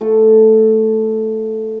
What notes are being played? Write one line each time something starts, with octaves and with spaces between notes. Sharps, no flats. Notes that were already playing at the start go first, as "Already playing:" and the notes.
A3 F4 A4